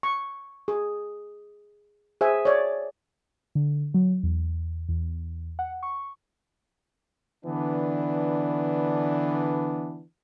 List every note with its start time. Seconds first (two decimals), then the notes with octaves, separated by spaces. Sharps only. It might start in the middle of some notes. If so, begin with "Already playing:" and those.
0.03 C#6
0.68 G#4
2.21 G#4 C5 E5 G#5
2.45 C#5 D5
3.55 D3
3.94 F#3
4.23 E2
4.89 E2
5.59 F#5
5.83 C#6
7.46 D3 E3 B3 D4